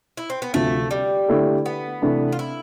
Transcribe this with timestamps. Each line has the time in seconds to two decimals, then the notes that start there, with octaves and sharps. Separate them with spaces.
0.17 E4
0.30 C4
0.42 B3
0.54 D2 C3 F3 A3
0.91 G3
1.28 D3 A3 E4 A4
1.66 B3
2.02 C3 E3 A3 D4
2.32 F4
2.39 E4